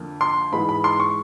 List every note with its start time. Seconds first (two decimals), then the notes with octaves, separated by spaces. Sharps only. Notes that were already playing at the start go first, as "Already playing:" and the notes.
Already playing: F2 D3 A#3
0.21 C6
0.52 G#2 E3 G#3 B5
0.69 B5
0.84 C6
1.00 C#6